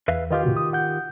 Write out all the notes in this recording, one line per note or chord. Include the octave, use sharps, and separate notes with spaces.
E2 B4 E5 F5
D#3 F4 G4 B4 D#5 F5
A2 C3 F#4
D#6
F#5 G6